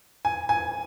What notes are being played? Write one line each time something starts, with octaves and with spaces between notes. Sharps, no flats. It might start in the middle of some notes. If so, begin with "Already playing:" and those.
G#5
G#5